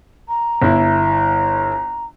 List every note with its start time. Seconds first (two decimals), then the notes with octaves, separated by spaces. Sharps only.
0.29 A#5
0.62 G1 E4